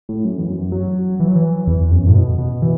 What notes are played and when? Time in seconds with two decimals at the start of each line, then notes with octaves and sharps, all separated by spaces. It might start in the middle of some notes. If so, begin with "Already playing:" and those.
0.09 A2
0.25 F#2
0.37 E2
0.49 F#2
0.72 F#3
1.20 E3
1.28 F#3
1.36 E3
1.67 E2
1.91 F#2
2.07 A2
2.15 B2
2.39 B2
2.62 E3